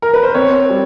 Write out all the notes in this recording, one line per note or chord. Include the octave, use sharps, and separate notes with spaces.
A#4
B4
C5
C4 C#5
G3